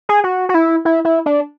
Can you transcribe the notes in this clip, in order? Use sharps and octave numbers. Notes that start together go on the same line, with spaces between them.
G#4
F#4
F#4
E4
E4
E4
D4